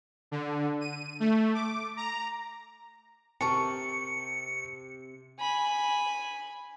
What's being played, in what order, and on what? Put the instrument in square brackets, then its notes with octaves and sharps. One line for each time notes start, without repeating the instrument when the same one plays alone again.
[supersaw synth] D3
D#7
A3
D6
A#5
[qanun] C3 A#4 [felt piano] A5 C#6 [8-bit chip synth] C#7
[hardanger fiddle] G#5 B5